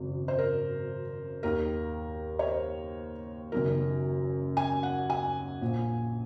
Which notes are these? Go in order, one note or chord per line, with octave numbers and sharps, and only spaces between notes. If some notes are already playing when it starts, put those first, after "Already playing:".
Already playing: G#1 F#2 C#3
C5
A#4
D#2 D#3 A#4
C#5
C5
F#1 F#2 D#3 A#4
G#5
F#5
G#5
A#1 A#2